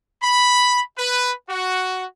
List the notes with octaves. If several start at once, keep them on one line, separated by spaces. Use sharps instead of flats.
B5
B4
F#4